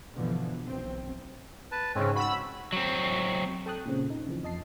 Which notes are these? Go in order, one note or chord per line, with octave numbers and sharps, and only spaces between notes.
G2 B2 D3 E3 F3
B1 C4
B4 A5
G#2 C#3 C4 C#4
F#4 B5 E6
F#3 C4
A4 G5 A5 D#6 F#6
A#2 C#3 C4
D#4
C#3 E3 F3
F2 D#5 A5 C7